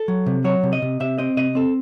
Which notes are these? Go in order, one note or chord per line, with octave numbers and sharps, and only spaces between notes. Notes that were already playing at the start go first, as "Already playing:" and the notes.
Already playing: A4
F#3
C3
F#3 C#5
C3
D#5
C3
C3 E5
C4 D#5
C3 D#5
C4 A4